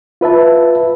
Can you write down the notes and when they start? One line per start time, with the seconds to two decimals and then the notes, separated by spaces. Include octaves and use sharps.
0.21 F4 B4 E5 A5